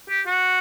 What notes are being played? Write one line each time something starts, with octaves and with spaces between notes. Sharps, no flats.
G4
F#4